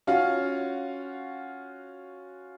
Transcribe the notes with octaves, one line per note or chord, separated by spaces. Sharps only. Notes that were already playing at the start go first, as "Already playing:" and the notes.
C#4 F4 F#4 F5